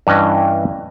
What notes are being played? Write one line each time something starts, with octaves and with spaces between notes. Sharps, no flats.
G2 E3 C#4 D#5